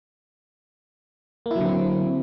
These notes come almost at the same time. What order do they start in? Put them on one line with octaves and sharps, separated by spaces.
A#3 E4 F#3 D3 C4